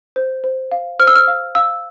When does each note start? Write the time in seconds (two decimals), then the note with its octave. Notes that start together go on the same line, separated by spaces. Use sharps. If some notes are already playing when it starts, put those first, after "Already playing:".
0.16 C5
0.44 C5
0.72 F5
0.99 C5 F6
1.07 E6
1.16 F6
1.27 F5
1.55 F5 E6